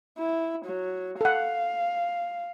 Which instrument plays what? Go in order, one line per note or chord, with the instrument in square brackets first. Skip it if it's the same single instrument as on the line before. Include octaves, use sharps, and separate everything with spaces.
[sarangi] E4
F#3
[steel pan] A4 F#5 [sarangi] F5